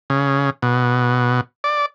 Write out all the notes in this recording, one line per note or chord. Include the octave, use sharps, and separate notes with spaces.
C#3
B2
D5